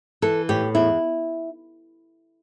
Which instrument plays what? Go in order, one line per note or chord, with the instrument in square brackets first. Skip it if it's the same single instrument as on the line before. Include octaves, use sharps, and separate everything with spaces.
[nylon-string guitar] E3 A4
A2 G4
E2 E4